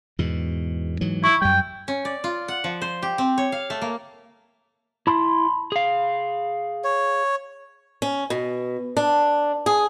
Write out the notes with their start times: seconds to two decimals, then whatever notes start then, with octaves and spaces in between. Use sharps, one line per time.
0.19 E2 G#2 B2
1.01 G#2 E3 F#3
1.24 E4 C#6
1.42 F#2 G3 G5
1.88 C#4
2.05 D5
2.24 F4
2.48 F#5
2.64 F3
2.82 C5
3.02 G4
3.18 C4
3.38 C#5
3.52 F5
3.70 A3
3.82 A#3
5.07 E4 A5 B5 C6
5.72 G#4 F5
6.84 C#5
8.02 C#4
8.30 B2
8.97 D4
9.66 G#4